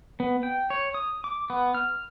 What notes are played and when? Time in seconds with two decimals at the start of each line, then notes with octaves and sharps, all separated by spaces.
0.20 B3
0.43 G5
0.70 C#5
0.94 D#6
1.24 D6
1.50 B3
1.75 F6